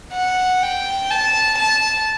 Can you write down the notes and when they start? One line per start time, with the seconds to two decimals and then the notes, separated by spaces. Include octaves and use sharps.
0.13 F#5
0.62 G5
1.10 A5
1.58 A5